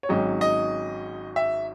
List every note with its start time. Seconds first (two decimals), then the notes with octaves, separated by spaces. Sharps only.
0.03 C#5
0.09 G#1 G#2 F#3 C#4 D#5
0.41 D#5
1.36 E5